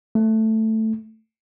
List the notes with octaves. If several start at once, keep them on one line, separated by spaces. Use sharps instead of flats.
A3